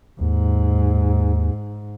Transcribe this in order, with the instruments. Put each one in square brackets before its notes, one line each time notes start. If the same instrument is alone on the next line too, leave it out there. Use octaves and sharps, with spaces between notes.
[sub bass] D#2 [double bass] G#2